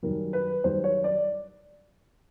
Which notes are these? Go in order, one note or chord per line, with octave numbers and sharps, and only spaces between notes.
F#2 D#3 G3 A#4
B4
F#2 D#3 G3 C5
C#5
D5